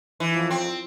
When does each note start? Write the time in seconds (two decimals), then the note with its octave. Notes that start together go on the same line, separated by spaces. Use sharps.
0.20 E3
0.35 F3
0.51 C4